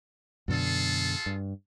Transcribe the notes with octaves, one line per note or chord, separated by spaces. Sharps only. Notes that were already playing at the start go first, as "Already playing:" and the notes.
F#2 B2 D3 F4 G#4 A4
G2